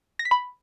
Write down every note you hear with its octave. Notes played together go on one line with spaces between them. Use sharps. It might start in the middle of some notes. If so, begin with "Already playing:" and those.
A#6
B6
B5